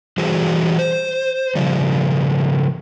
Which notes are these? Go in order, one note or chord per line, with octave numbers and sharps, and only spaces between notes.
E3 G3 F#4 G#4 C5
C5
C#3 F3 G3